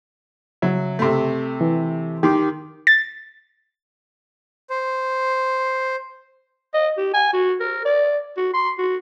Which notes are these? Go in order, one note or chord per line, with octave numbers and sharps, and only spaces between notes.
C#3 F#3 E5
C3 A3
E3
D#3 G4 C6 D6
A6
C5
D#5
G4
G#5
F#4
A#4
D5
F#4
C6
F#4